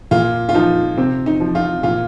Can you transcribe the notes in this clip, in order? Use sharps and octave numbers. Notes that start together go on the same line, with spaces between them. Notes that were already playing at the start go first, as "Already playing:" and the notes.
A#2 F4
F4
F3 D#4
C3 C4
D#4
F3
F4
A#2 F4